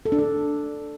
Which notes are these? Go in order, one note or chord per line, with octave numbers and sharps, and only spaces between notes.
A4
D4
A4